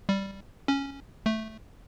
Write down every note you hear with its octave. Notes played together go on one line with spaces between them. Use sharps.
G3
C#4
A3